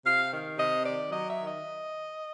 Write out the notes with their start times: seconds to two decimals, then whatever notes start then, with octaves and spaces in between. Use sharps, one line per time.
0.04 C3 F5
0.31 D#3
0.57 C3 D#5
0.83 D#3 D5
1.10 F#3 D#5
1.27 E5
1.37 D#3
1.45 D#5